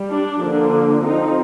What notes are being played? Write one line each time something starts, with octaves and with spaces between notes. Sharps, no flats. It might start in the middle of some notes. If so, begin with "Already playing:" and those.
Already playing: G3
D4
D3 F3 A#3 D4
F3 C4 D#4